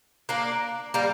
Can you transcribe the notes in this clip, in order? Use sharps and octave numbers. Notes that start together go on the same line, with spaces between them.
A#3 D4
G3 A#3